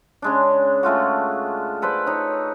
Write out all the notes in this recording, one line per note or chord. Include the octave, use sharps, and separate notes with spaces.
C#3 G#3 D4
G#3 A3 F4 F#4
A4 B4 C5 D5
D#4 C#5